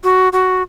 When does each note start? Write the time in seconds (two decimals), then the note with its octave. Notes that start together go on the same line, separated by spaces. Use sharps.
0.04 F#4
0.33 F#4